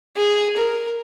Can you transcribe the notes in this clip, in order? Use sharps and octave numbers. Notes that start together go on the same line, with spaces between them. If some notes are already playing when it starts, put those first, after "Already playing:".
G#4
A#4